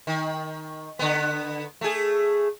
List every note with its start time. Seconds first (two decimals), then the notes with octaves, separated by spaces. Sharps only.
0.07 D#3
0.99 D3 B3
1.81 A3 G#4